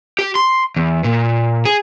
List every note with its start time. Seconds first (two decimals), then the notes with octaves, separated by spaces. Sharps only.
0.19 G4
0.35 C6
0.76 E2
1.04 A#2
1.65 G#4